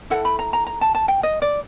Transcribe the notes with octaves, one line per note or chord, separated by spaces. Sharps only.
E4 A4 F#5
B5
A#5
A#5
A#5
A5
A5
G5
D#5
D5